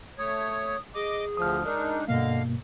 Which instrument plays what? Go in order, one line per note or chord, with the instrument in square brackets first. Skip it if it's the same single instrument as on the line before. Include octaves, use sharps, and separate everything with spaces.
[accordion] A3 C#5 [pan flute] D#6
[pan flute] G#4 [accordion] D#5 D6
[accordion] D2 F3 [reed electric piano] D#6 F6
[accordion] G#3 D4 D#4 [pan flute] A#4
[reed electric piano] G2 B2 A#3 [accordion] D3 F5 [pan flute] D#5